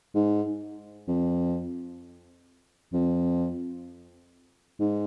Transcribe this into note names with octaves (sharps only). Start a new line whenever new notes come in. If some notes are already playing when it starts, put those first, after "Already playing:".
G#2
F2
F2
G#2